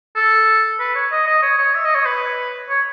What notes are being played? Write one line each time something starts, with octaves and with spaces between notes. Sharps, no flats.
A4
B4
C#5
D#5
D#5
C#5
C#5
E5
D#5
C#5
B4
C#5